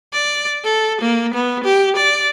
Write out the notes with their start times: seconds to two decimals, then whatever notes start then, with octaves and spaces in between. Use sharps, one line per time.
0.13 D5
0.64 A4
1.01 A#3
1.34 B3
1.64 G4
1.96 D5